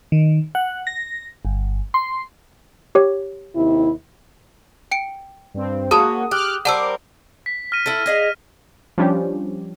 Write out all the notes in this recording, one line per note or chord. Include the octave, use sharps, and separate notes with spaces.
D#3
F#5
A#6
G1
C6
G4 C#5
D#2 C3 E4
G5 C#7 D7
G2 C4
A#3 C#4 F#4 G#4 A5 B5 D#6
G4 D6 F6 F#6
G3 C4 A#4 F#5 A5 D6 E6
B6
F6 A#6 D#7
E4 A4
G#4 D#5 F5
F3 G3 C#4 D4 G4